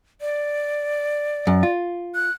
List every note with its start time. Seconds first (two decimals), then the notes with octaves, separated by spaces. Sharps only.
0.21 D5
1.47 F#2
1.63 F4
2.15 F#6